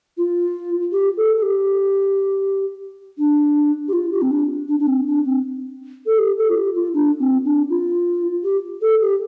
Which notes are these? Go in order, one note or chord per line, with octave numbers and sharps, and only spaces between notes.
F4
G4
A4
A4
G4
D4
G4
F4
G4
C4
D4
D4
D4
C4
D4
C4
A4
G4
A4
F4
G4
F4
D4
C4
D4
F4
G4
A4
G4